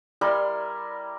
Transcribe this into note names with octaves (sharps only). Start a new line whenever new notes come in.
G3 E4 A#4 C6